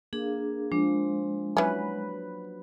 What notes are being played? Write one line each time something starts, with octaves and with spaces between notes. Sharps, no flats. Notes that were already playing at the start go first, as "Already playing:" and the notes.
A#3 D4 G#4
F3 G#3 D4
E3 F#3 C#4 B4